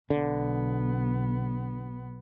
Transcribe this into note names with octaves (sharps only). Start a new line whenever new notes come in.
B1 D3 B3